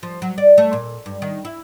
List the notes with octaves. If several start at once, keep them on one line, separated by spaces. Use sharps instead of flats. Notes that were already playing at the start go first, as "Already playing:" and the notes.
F3
F#3
D5
A3
A#2
G2
D#3
E4